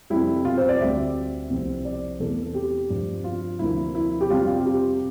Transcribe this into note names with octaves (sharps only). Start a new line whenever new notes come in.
F2 C3 G3 E4
F4
C5
D5
D2 D3 G3 C4 E5
C2 C3 F3 C4
D5
E2 C3 E3 A3 A4
G4
G2 F3 C4
F4
D2 C3 F3 A#3 D4 E4
E4
G4
F2 C3 G3 F4
F4
G4